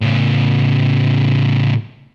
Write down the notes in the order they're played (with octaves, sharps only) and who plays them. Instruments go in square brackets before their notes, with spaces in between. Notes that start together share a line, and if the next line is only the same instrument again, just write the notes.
[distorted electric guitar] A2 C#3